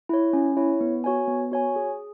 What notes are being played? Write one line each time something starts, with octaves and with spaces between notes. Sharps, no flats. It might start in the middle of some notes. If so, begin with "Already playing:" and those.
E4 C#5
C#4
E4 C#5
B3
F#4 C#5 G#5
B3
F#4 C#5 G#5
G#4